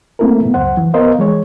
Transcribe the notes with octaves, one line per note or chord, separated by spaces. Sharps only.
A3 A#3 C4 E4 A4 A#4
G#2 B3
C#2 F#2 C5 F#5
E3
B3 A#4 C5 D#5 F5
E3 G#3 C#5